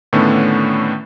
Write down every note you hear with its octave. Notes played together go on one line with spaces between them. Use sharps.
A2 D3 D#3 A3 B3 C#4